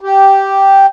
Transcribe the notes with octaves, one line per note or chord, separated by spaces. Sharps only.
G4